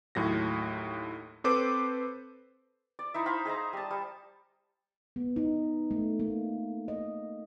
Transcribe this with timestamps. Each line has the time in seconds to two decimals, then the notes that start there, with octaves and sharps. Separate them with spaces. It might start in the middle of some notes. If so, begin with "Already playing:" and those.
0.15 D#2 A2 F#3 A#6
1.44 C4 A4 B4 C5 D6 D#7
2.99 D5
3.14 D#4 E4 E5
3.26 C5 F5 A#5 B5
3.45 G#4 D#5 E5 A#5
3.73 G3 A5
3.91 G3
5.16 B3
5.36 D#4
5.91 A3
6.20 A#3
6.88 D#5